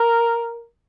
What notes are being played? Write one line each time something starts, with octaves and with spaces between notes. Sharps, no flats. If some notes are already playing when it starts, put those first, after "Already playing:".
Already playing: A#4